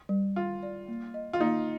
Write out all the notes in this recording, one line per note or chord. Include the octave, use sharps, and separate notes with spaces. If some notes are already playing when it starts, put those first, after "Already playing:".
G3
G3 F4
D5
A#3
D#5
F4
A#3 D#4